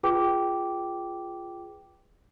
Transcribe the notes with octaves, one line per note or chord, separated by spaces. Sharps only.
F4 G#4 B4 G5 D6